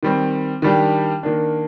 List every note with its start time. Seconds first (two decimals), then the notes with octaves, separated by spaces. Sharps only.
0.03 D#3 G3 C4
0.62 D#3 G3 D4 G4
1.23 D#3 A#3 D4